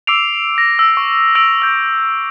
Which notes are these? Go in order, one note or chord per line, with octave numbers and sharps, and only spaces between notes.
D6 E6 C7 D7 F7
A#6
E6
C#6
E6 D7 F7
E6 G6 A#6